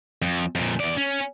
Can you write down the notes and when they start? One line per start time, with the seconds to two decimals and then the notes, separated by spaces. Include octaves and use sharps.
0.22 F2
0.55 F2 A#2
0.79 E2 D5
0.98 C#4